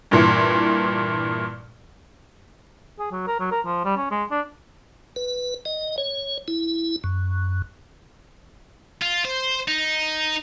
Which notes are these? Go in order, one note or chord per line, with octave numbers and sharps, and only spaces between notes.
G2 A#2 E3
G#4
F#3
A#4
F#3
A#4
F3
G3
C#4
G#3
D4
B4
D#5
C#5
E4
F#2
F4
C5
D#4